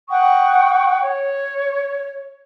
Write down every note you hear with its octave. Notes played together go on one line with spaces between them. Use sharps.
F#5 G5 C#6 D#6
C#5